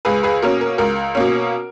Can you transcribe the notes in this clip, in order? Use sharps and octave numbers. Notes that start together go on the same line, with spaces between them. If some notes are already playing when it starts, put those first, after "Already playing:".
C#2 G#4 B4
G#4 B4
B2 A#3 C#4 A#4
A#4
C#2 A#4
B2 A#3 C#4